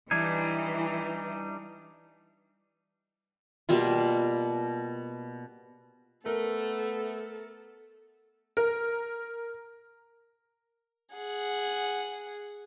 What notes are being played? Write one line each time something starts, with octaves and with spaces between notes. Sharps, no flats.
E3 G3 D4 D#4 G#6
B2 G3 A#3 F4
A3 B3 A4 A#4
A#4
G#4 F#5